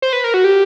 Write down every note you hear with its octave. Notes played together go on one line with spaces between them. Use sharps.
C5
B4
A#4
F#4
G4